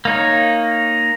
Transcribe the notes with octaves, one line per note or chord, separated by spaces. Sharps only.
A#3 D#4 C#5